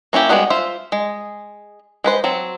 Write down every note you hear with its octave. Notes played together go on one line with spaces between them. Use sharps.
A#3 C#4 E4 G4
G3 G#3 B3 D#4 F#4
F4 C5 E5
G#3
G#3 B4 C5
F#3 C4